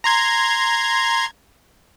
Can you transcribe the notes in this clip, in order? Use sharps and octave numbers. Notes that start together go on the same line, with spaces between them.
A#5 C6 G#6